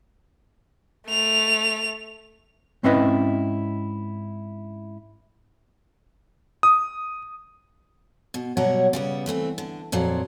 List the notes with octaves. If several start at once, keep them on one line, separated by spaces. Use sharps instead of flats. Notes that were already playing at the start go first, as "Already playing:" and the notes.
A3 F7
G#2 C4 C#4 E4 B4 D#5
D#6
B2
B2 F#3 G3 C#5 F#5
C#3 G3 B3
E3 A3 B3 C4
D3
F2 A#2 F#3